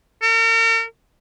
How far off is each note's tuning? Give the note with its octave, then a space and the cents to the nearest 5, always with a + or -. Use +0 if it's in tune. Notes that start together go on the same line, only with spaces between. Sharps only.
A#4 -40